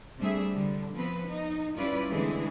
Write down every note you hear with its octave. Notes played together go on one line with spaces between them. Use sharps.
C3 G3 A3 D4 G#4 E5
D3 G3
F3 B3 C4 B4
D#4
G3 C#4 E4 F4 B4 D5
D3 E3 G#3 A3 C4 G#4